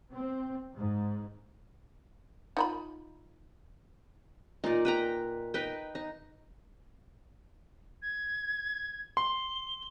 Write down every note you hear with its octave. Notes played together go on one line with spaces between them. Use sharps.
C4
G#2
D#4 F4 B5
A#2 D#4 D5
B4 G5 A#5
D#4 B4 G5
D#4
G#6
C6 G7